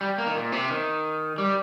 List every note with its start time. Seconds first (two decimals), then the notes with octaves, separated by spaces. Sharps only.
0.01 G3
0.18 A#3
0.27 D#3
0.36 A#2
0.52 C3
0.70 D#3
1.38 G3